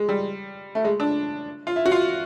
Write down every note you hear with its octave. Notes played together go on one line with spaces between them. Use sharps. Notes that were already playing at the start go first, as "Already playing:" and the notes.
Already playing: G#3
G3
A3
G#3
D4
F4
E4
F#4
F4